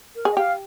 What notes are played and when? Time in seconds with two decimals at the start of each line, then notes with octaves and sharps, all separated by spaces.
0.16 A#4
0.25 G#4
0.32 D#5
0.37 G4 F5